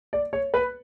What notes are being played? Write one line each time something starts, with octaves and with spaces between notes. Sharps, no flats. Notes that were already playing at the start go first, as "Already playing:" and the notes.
D5
C#5
B4